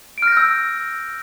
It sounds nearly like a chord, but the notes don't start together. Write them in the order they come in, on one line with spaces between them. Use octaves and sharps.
D7 F6 A#6 G6 E6